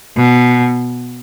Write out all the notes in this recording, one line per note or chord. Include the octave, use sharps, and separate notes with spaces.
B2